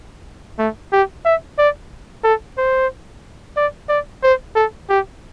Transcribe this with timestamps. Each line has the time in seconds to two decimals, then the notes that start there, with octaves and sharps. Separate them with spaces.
0.59 A3
0.92 G4
1.25 E5
1.58 D5
2.24 A4
2.57 C5
3.57 D5
3.89 D5
4.23 C5
4.55 A4
4.89 G4